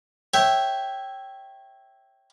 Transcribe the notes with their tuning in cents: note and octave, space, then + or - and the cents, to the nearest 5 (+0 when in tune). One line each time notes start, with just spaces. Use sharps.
C#5 -25 E5 +0 G5 -10